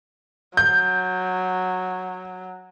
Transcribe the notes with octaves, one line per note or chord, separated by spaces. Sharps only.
F#3 G6